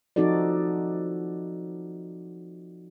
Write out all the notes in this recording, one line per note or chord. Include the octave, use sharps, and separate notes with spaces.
F3 C4 D#4 F#4 A4 D5